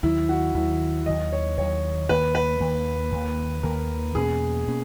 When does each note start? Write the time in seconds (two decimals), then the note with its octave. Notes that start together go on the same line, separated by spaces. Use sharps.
0.03 D#2 D#3 F#3 E4
0.29 F#4
0.54 D#2 D#3 F#3 E4
1.06 D#2 D#3 F#3 D#5
1.32 C#5
1.58 D#2 D#3 F#3 C#5
2.09 D#2 D#3 A#3 B4
2.35 B4
2.60 D#2 D#3 A#3
3.12 D#2 D#3 A#3
3.63 D#2 D#3 A#3 A#4
4.15 E2 B2 A#3 C#4 G#4
4.67 B2 A#3 C#4